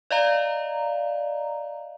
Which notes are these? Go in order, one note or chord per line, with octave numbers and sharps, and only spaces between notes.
D5 D#5 F5 A#5